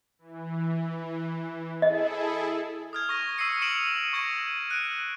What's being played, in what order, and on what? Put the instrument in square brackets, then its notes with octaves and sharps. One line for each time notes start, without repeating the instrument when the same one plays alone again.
[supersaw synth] E3
[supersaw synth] E4 G#4 A4 [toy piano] D#5
[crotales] D#6 F6 G#6
C#6 A#6
C#6 E6 A#6 C7 C#7 D#7
D#6 C#7 D7 E7 F#7
C#6 G#6 A#6 D#7
F#6 D7